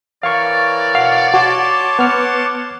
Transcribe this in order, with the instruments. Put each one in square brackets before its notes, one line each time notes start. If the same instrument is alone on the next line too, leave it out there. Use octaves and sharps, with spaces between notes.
[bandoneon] E3 A#4 C#5 [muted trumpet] D5 [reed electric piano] F5 C#6
[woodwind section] B2 F#5 [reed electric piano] F5
[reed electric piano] F#4 [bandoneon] C#5 A5 C6 [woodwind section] D6
[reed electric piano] B3 F6 [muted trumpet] F#5